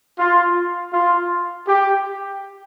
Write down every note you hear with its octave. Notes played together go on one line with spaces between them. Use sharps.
F4
F4
G4